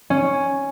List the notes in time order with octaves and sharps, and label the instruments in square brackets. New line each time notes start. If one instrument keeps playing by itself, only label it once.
[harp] C#4